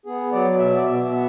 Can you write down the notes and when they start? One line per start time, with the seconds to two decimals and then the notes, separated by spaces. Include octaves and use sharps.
0.06 B3 G#4
0.32 F#3 D5
0.59 B2 E5
0.75 D5
0.85 B2 E5
1.12 B3